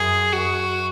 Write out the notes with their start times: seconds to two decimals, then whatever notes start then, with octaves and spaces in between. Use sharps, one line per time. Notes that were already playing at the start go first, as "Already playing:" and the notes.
Already playing: F#2 G#4
0.33 F#2 F#4